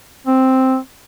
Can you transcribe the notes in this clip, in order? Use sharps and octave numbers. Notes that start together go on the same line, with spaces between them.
C4